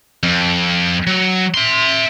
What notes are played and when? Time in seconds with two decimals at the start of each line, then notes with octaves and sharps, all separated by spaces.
0.23 F2
1.07 F#3
1.54 E5 C6